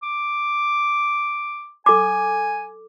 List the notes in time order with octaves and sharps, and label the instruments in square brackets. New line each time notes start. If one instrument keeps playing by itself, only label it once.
[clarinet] D6
[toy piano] A4 D6 [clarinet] G#5